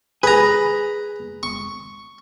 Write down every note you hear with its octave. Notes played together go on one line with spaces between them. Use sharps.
G#4 B4 A#5
C#6